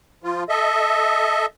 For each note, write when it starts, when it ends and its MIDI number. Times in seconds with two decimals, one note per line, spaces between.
0.24 0.44 53
0.24 0.44 65
0.49 1.46 69
0.49 1.46 75
0.49 1.46 76